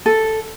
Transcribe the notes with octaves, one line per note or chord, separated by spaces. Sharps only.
A4